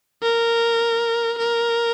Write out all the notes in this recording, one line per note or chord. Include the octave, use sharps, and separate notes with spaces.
A#4
A#4